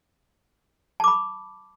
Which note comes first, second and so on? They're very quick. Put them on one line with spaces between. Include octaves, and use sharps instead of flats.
A5 D6 B5